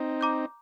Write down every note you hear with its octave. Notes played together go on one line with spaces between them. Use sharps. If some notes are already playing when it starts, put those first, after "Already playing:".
Already playing: C4 D#4
A#5 D6 G6